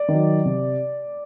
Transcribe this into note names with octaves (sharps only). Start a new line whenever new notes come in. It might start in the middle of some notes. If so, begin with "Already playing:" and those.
Already playing: D5
D#3
F#3
C3